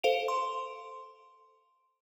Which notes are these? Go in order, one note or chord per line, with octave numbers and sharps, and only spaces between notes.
A4 C5 F5 D7 F7
C6